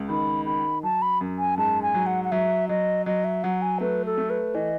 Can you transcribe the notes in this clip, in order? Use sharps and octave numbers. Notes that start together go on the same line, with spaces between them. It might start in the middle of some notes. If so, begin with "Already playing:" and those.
Already playing: C#2
D#3 B5
D#3 B5
F#3 A5
B5
F#2
G#5
G#2 A5
G#5
F#3
F#5
F#5
F#3 E5
F#3 D#5
F#3 D#5
E5
F#3 F#5
G#5
A3 B4
A4
A3
B4
E3 D#5